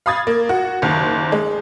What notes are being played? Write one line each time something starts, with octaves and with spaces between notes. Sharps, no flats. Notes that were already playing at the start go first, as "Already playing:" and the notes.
F5 B5 D#6 G#6 A6
A#3
F#4
F#1 D#2
G#3